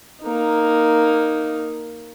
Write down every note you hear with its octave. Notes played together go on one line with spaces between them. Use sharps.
A#3 D#4